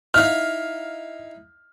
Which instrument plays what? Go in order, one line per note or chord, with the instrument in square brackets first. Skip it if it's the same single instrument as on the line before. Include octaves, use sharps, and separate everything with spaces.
[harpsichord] D#4 E4 F5 [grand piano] F6